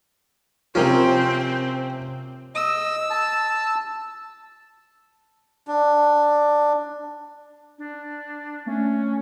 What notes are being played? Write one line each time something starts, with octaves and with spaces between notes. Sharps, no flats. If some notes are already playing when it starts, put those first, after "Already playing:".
C3 F3 C4 C#4 A#4 C5
D#5 E6
A5
D4
D4
A3 C#4